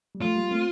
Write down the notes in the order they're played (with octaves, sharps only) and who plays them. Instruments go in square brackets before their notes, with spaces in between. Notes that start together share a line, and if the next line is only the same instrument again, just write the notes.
[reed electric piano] G3
[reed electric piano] F3 A3 [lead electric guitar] F4
[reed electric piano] G3 A#3
A3 C4